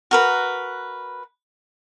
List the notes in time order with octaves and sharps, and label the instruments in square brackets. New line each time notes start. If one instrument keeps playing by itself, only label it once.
[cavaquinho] F#4 A#4 B4